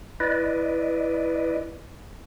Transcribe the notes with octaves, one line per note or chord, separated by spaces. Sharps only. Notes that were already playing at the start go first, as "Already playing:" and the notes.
E4 B4 D5 D#5